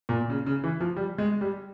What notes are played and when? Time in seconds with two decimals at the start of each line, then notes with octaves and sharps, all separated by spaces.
0.09 A#2
0.30 C#3
0.46 C#3
0.64 E3
0.80 F3
0.96 G3
1.18 G#3
1.41 G3